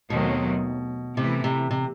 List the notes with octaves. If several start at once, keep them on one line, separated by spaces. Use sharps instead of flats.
D#2 B2 D#3 F#3 A3 C4
C3 E3 A3 E4
C3
C3